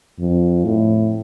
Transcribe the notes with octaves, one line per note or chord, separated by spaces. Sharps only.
F2
A2